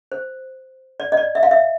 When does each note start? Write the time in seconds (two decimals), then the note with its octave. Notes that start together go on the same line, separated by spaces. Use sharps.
0.12 C5
1.00 D5
1.12 D#5
1.17 D5
1.35 E5
1.43 F5
1.51 E5